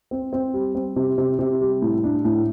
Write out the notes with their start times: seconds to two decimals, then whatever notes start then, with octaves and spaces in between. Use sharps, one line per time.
0.11 C4
0.33 C4
0.54 G3
0.75 C4
0.96 C3
1.18 C3
1.39 C3
1.61 G3
1.82 A2
2.04 D4
2.25 A2